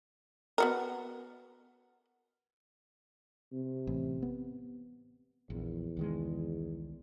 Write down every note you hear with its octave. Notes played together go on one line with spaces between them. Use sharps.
B3 F#4 A#4
C3
A1
B3
A#1 E2
C2 D#3 G#3